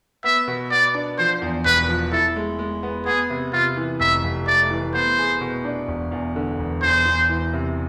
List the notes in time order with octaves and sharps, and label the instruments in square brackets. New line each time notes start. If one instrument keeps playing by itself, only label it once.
[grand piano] B3 [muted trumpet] E5
[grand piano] B2
[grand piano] B3 [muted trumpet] D5
[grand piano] D4
[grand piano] F3 [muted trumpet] C5
[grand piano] E2
[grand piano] E1 [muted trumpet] B4
[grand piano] F3
[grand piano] E4 [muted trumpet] A4
[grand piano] G#3
G#3
B3
[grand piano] B3 [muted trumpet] G#4
[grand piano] C3
[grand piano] C3 [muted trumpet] F4
[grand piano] E3
[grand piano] F1 [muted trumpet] E5
[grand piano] F1
[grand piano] A3 [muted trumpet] D5
[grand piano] E3
[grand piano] B3 [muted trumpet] C5
[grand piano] G#4
B2
D4
E1
E2
D3
E1
[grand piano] E2 [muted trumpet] C5
[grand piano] E2
E3
C3